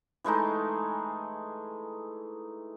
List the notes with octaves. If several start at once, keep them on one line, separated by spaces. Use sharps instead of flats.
E3 G#3 A3 D#4